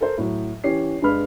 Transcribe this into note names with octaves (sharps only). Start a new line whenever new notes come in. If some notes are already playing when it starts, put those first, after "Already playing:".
A4 A#4 C5
A2 F#3
E3 C#4 G4 C7
G2 G#3 D4 B4 B5 F6